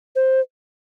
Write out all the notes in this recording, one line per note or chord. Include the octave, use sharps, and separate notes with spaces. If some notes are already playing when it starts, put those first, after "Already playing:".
C5